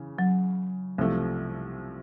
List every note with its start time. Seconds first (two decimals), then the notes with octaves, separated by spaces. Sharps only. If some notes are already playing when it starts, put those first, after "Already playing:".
Already playing: C#3 E3
0.19 F#3
0.98 C2 C3 F3 A3